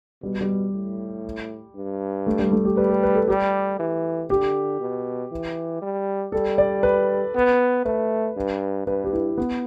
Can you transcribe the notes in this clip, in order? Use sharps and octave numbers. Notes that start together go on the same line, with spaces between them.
B2 G3
G3
A2
G2
A3
G3
A3
G4
G3 B4
A4
B4
A4
G3 G4
E3
D3 G4
B2
E3
G3
G3 A4
D5
B4
B3
A3 B4
G2
G2 B4
G4
E4
B3